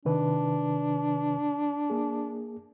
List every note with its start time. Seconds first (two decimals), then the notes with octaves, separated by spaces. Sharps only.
0.05 C3 D#3 D4 B4
1.90 A#3 G#4